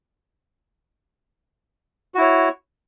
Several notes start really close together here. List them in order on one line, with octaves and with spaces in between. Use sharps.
F#4 E4 C#5